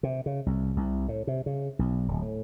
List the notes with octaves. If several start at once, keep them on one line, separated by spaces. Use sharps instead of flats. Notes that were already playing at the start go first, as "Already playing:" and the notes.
C3
C#3
C2
C2
A2
C3
C#3
B1
D1
A2